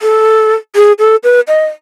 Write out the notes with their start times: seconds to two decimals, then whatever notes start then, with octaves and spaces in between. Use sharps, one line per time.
0.02 A4
0.76 G#4
0.99 A4
1.24 B4
1.48 D#5